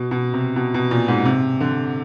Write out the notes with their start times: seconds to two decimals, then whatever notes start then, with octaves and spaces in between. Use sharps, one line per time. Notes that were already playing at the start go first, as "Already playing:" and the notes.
Already playing: B2
0.11 B2
0.34 C3
0.56 B2
0.74 B2
0.91 A#2
1.08 G#2
1.25 C3
1.60 D3